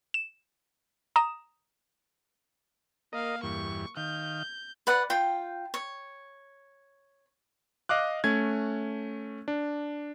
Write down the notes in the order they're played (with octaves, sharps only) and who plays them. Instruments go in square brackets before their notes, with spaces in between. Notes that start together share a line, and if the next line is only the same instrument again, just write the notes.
[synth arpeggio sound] E7
A#5 D#6 E7
[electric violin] A#3 F5 [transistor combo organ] A#4 D#5
[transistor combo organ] E2 G2 [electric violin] C#6
[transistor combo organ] D#3 F5 [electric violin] G6
[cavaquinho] B4 D5 F#5
F4 G5
C#5
[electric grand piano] D#5 F5 D6 F#6
A3 C#4 G#6
D4